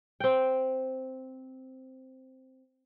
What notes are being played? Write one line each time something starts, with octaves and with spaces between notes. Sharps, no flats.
C4 G5